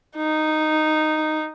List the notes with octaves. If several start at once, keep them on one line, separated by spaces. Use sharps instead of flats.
D#4